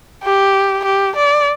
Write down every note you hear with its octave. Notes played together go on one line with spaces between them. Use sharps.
G4
G4
D5